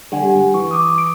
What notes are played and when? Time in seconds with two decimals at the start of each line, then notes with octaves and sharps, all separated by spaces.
0.12 D3 G3 G4 F#5 G#5
0.35 G2
0.54 E3 C#6
0.71 D6 D#6
0.98 D7